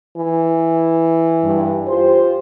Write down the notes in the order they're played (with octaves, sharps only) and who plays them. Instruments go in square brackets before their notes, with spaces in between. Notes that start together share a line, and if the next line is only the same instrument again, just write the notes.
[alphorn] E3
[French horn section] G2
F4 G4 C5